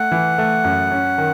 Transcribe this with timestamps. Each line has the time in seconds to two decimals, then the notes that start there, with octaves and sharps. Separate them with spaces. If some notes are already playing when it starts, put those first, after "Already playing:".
Already playing: A3 F#5
0.12 E3
0.38 A3
0.64 F#2
0.92 C#4
1.18 D#3